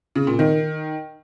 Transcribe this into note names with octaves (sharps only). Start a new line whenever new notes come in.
C#3
A#2
D#3